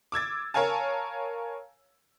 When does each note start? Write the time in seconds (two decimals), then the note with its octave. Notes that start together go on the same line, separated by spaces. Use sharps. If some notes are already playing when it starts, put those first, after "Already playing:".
0.12 D6 E6 G#6 A6
0.54 A#4 C#5 F5 G#5 A5